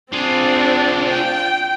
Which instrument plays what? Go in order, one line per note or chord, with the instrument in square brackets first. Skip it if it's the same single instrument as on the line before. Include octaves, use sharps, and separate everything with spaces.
[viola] C4 D4 [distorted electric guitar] F4 G#4
[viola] G5